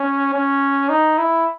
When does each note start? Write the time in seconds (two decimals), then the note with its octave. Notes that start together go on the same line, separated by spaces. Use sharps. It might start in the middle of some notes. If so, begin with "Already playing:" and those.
Already playing: C#4
0.34 C#4
0.89 D#4
1.18 E4